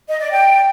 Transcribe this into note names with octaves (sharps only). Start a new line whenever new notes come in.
D#5
D5
G5